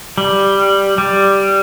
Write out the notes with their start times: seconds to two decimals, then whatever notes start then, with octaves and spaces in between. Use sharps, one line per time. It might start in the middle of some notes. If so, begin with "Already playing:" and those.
0.18 G3
0.98 G3